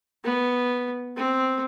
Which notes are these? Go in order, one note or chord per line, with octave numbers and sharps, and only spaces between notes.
B3
C4